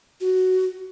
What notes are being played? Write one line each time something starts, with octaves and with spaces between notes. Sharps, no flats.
F#4